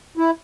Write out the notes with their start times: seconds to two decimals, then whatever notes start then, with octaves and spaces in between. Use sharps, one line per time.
0.17 E4